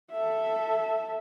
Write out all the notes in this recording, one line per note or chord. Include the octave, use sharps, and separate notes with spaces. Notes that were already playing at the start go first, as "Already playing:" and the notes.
A4 E5